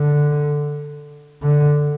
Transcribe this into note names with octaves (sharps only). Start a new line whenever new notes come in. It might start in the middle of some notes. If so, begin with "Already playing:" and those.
Already playing: D3
D3